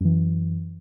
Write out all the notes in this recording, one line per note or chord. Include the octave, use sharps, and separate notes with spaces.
F#2 E3